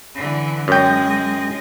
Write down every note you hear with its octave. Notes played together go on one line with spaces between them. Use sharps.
D3 E3
F#2 G#3 D#5 G5